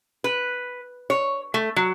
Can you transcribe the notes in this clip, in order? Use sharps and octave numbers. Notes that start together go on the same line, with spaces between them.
B4
C#5
A3
F#3